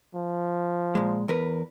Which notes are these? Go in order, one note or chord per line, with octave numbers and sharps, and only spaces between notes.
F3
A#2 G#3
E2 A#4 B4